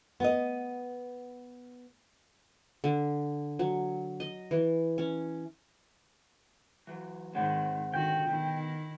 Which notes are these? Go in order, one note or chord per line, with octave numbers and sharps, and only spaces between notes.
B3 D#5
D3
F#3
D#5
E3
C#4
E3 F#3
G#2 D#3 C4 C#5 F#5
D3 D#3 F#4 G5
B2 D#3 E4